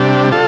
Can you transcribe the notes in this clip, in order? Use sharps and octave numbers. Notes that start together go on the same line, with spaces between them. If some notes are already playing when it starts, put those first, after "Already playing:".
Already playing: C3 G3 D4
F4 A4